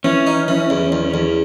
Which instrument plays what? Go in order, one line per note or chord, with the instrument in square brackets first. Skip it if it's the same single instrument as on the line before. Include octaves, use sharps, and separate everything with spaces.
[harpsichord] E3 [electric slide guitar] C#4
[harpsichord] D#4
E3
E2
E2
E2